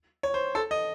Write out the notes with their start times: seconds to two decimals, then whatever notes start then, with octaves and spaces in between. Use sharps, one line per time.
0.23 C#5
0.34 C5
0.55 A4
0.71 D#5